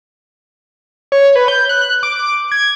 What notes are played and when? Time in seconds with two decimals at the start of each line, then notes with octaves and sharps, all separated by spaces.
1.12 C#5
1.36 B4
1.48 G6
1.69 F#6
2.03 D6
2.52 G#6